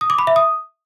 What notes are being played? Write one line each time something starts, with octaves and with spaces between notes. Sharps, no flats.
D#6
D6
B5
E5
D#6